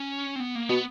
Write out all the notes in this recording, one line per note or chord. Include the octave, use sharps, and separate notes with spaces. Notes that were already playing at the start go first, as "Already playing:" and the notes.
Already playing: C#4
C4
B3
A#3
B2 B3